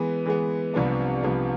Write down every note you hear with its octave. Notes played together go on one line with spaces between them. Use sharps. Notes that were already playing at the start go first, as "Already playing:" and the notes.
Already playing: E3 G#3 B3
E3 G#3 B3
C2 C3 F3 B3 D4
C2 C3 F3 B3 D4